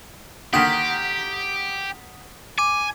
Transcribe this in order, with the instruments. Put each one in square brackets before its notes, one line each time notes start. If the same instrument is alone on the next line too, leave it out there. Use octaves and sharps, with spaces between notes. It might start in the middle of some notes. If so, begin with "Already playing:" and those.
[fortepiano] D3 D#3 A#3 [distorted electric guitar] G4 [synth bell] F#5 D#6 B6
[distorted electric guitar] G#5 [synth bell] D6